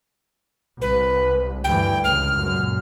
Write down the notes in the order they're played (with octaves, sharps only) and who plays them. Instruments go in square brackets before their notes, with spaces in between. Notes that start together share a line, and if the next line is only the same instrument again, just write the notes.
[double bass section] C2 [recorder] B4
[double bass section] D2 G2 E3 [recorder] G5
[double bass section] C#2 [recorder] F6
[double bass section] F#2 A#2